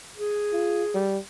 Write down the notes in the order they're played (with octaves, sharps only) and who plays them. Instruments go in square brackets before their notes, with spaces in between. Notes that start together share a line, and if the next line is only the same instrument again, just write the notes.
[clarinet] G#4
[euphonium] F4
G3